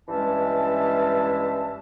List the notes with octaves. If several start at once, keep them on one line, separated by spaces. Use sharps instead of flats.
G2 E3 G#3 C#4 E5 A5